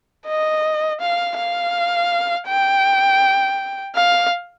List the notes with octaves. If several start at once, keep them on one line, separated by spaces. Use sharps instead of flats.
D#5
F5
F5
G5
F5